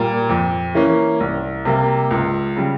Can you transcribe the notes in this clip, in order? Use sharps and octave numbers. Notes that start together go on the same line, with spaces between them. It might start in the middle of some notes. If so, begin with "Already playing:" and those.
Already playing: A#2 G3 A#3
F2
E3 A#3 C#4
C2
C3 G3 A#3
C#2
C#3 G3